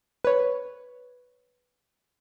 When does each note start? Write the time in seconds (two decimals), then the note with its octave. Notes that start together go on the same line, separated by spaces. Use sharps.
0.25 B4 C#5